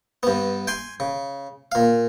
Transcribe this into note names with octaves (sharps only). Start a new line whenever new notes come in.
G2 B3
G5 G#5 C6
C#3
A#2 F5